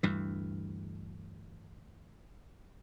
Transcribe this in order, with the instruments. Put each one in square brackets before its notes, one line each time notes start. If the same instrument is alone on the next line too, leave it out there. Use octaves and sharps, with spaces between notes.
[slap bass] D2 G2 E3